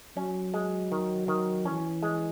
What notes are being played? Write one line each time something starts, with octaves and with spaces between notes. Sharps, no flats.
F#3 C#4
G#3
D#3
D#3
E3 C#4
G#3